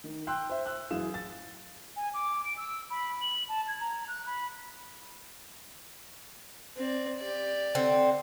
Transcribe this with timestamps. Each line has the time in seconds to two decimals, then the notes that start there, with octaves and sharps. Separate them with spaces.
0.04 D#3
0.27 G5 C6 E6 F#6 G6
0.50 C5 E5
0.65 E6 F#6
0.91 F#2 E3 G#4 F5 E7
1.14 A6
1.97 G#5
2.14 D6
2.45 D7
2.57 E6
2.90 B5
3.22 F#7
3.49 A5
3.68 G#6
3.80 A#5
4.08 F#6
4.26 B5
6.76 C4 D5
7.17 G4 D5
7.75 D3 C4